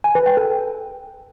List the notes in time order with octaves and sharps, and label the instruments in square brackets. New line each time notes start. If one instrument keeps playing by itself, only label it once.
[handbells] G#5
B4
G5
A4